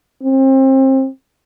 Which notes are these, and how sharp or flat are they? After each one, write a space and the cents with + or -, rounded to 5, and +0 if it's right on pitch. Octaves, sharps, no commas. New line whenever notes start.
C4 +30